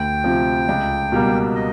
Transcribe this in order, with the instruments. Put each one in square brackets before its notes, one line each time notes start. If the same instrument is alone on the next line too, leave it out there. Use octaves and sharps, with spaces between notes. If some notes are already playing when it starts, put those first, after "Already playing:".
Already playing: [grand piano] D2 [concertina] G5
[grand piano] C3 F3
C#2
B2 G3 A#3
[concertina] D#5